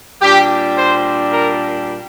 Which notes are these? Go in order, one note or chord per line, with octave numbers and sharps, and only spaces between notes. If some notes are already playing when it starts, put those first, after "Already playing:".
A#2 G3 D4 G4
C5
A#4